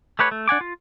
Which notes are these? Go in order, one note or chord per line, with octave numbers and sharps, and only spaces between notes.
A3 G4 B4 C#5
A3
D4 F#5 G#5 D6
F4